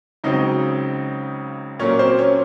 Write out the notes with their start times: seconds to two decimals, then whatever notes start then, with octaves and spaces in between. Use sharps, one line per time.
0.24 C#2 C#3 F#3 C4 D#4 D#5
1.79 A#2 F#3 A#3 C#4 C#5
1.99 C4 C5
2.19 C#4 C#5